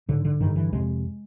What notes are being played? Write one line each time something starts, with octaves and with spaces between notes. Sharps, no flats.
G#2 D3
D3
G2 D3 D#3
E3
F2 C3 G#3